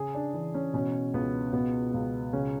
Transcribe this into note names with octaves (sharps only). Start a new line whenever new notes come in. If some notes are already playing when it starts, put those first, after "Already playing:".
Already playing: C#3 G#4
D4
E3 D4
C#4
B2 C#4
C#2 B3
B2 B3
C#2
C#3 C#4